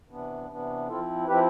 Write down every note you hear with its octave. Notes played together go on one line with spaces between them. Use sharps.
C3 E3 B3 D4
C3 E3 B3 D4
F3 C4 E4 F4 A4
F3 C4 E4 G4 B4